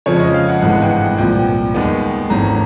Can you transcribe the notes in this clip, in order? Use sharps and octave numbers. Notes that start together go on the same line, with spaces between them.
F2 C#3 F3 G#3 C#4 C#5
D#5
F5
F#5
G#1 G2 E3 G#3 B3 F#5
G5
F#5
C2 A#2 F3 G5
D#2 D#3 G#3 B3
G#1 G2 E3 A3 C#4 A#5